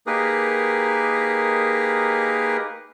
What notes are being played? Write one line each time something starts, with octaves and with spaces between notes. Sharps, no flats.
A#3 D#4 G4 G#4 A#4 B4